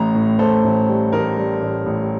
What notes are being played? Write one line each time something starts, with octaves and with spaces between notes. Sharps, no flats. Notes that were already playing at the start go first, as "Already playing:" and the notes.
Already playing: A1 A2 A#5
A2
A2 A4 C5
A1
G3
A1 A#4
G3
A1
A1